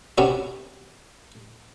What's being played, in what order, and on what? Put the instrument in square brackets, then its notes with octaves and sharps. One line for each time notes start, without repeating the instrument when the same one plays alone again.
[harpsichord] C3 B3 C#4 D4 F#4